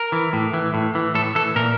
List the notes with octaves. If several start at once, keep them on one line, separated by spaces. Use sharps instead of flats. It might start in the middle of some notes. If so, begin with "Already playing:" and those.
Already playing: A#4
E3
A2
E3
A2
E3
A2 A4
E3 A4
A#2 A#4